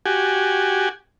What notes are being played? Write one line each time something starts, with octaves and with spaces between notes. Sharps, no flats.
F#4 G4 G#5